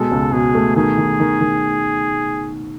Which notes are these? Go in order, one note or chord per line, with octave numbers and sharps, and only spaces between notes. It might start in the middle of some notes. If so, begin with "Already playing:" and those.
Already playing: B2 G#3 A4
C#2
B2 G#4
A3
D#3 G#4
D#3
D#3
D#3